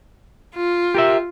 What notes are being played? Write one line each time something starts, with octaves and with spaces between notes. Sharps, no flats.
F4
G4 A#4 E5